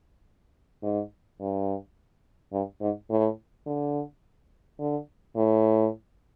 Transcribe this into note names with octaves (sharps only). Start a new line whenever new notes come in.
G#2
G2
G2
G#2
A2
D3
D3
A2